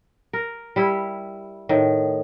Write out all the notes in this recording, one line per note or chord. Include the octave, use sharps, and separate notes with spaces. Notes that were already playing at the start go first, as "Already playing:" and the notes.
A#4
G3 E4
A2 D#3